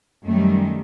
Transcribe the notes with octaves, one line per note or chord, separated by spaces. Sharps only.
F#2 D#3 G3 A3